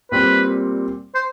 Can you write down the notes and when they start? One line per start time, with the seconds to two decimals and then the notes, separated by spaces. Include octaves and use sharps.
0.12 A#2 G3 C4 B4
1.15 C5